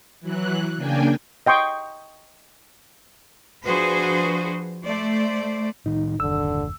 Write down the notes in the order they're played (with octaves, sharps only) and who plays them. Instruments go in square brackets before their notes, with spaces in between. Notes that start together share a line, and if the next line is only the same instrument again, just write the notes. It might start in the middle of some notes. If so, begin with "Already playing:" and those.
[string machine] E3 F#3 F#6
C#3 A#3 D4 G5 G#5
[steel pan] D#5 G5 C6 C#6 D#6
[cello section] F3 D4 F#4 G#4 B4 C5
A3 C5 D5
[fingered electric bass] A2 D#3 [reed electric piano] D#4
[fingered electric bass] F#1 D#2 [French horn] D3 [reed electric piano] E6